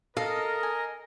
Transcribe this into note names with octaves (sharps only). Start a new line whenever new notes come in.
A4 A#4 D#5 F5
G#5